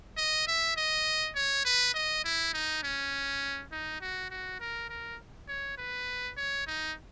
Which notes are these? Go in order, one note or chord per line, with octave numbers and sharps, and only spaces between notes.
D#5
E5
D#5
C#5
B4
D#5
E4
D#4
C#4
D#4
F#4
F#4
A#4
A#4
C#5
B4
C#5
D#4